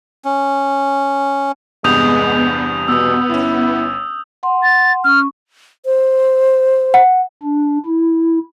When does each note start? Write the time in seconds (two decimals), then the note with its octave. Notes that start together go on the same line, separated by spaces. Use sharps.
0.25 C#4
1.84 E2 G2 C3 G#3 B3 D#6 G6 F7
2.88 B2 B3 D#6 E6
3.30 G1 C#4 E4
4.43 F#5 C6
4.63 A6
5.04 C#4 C#6 F6
5.86 C5
6.94 F#5
7.43 D4
7.86 E4